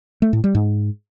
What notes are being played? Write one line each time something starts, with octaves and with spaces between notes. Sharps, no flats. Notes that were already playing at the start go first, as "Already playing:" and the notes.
A3
A2
G3
G#2